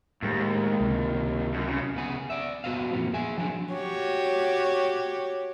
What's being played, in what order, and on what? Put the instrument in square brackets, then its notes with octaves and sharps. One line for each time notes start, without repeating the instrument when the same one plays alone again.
[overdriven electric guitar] D#2 [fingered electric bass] A2 G#3
[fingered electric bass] C#2 C3
[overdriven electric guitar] F#2
C#3
[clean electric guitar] C#3 B3 G#4
D5 E5
B3 F#4 G4 C5 D#5 F5
F2 A#2 E3 B3
G#4 E5 G#5
F3 F#3 C#4 D4
[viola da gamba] F#4 G4 C#5